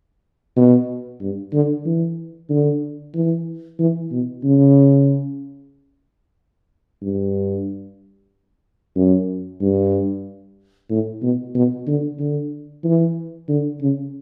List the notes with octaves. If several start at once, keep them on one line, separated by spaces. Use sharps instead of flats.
B2
G2
D3
E3
D3
E3
E3
B2
C#3
G2
F#2
G2
A2
B2
B2
D3
D3
E3
D3
C#3